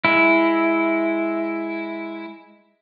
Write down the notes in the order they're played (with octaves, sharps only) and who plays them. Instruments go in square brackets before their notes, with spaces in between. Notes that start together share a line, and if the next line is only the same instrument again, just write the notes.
[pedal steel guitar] G#3 E4